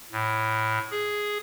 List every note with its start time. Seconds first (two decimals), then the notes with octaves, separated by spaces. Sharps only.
0.12 A2
0.91 G#4